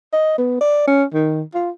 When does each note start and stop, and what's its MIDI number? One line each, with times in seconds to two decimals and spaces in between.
0.13 0.36 75
0.38 0.60 59
0.61 0.85 74
0.87 1.04 61
1.14 1.42 51
1.54 1.70 65